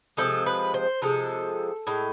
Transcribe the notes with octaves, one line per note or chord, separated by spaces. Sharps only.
C3 F3 G#3 A4
B4
C5
C3 F3 G#3 A4
A2 G#3